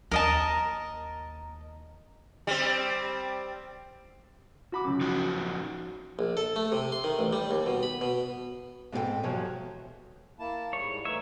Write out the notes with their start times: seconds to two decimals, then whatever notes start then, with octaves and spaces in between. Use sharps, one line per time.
0.11 D#2 A#4 D#5 A5
2.47 G3 C4
4.72 F#4 B5 D6
4.84 C#2 F#2
5.01 F3 D#4 F#4
6.19 A#1
6.37 A4
6.56 A3
6.72 C3
6.92 C6
7.04 D#3
7.19 A1
7.33 G3
7.51 D#2
7.66 B2
7.83 B5
8.01 B2
8.92 G#2 B2 C4 F#4 A4 G5
9.23 E2 B2 F3 F#3 G4 C#5
10.39 A#3 E4 A5
10.73 G#2 G3 C#5
11.05 E3 A3 D#4 C#5 E5